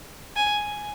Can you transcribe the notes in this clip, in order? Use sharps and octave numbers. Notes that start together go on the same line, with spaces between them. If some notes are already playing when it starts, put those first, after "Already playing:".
G#5